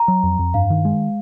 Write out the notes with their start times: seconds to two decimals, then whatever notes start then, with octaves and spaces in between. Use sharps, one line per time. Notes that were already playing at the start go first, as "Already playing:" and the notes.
Already playing: A#5
0.08 F#3
0.23 F2
0.39 F2
0.54 G2 F5
0.70 D#3
0.85 G#3